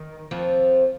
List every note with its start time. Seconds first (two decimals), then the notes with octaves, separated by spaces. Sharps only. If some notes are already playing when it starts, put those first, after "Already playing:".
Already playing: D#3
0.31 F2 F3